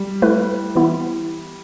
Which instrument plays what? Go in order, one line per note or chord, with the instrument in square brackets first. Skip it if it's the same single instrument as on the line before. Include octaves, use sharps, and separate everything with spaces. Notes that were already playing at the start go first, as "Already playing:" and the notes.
Already playing: [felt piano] G3
[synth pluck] A3 E4 B4
E3 B3 E4